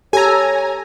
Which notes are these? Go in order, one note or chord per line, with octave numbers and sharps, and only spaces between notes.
G4 A4 C#5 G#5 A#5